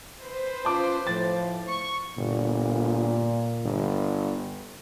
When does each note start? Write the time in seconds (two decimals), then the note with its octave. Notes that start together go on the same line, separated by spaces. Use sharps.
0.21 B4 C5
0.65 C#4 F4 A5 D6
1.07 A2 F3 A6
1.68 C#6
2.18 G1 A#2
3.65 G1